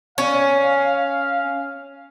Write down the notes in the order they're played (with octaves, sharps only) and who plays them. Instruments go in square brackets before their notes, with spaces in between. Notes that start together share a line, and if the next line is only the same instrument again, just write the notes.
[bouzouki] C#4 [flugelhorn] F5